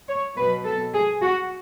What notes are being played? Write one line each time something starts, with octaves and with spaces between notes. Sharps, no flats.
C#5
B2 F#3 B4
A4
G#4
F#4